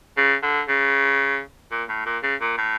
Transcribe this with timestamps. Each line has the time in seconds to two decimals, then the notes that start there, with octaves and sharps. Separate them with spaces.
0.17 C#3
0.43 D3
0.68 C#3
1.71 A#2
1.89 A2
2.06 A#2
2.23 C#3
2.41 A#2
2.58 A2